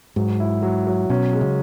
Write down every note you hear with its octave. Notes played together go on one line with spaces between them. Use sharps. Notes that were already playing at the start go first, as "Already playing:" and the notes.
G#2 F#3
E4
F#3
F#3
B2 C#4
G#3
C#3